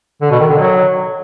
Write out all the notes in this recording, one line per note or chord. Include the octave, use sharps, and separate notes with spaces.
D3
B2
D#3
D3
F#3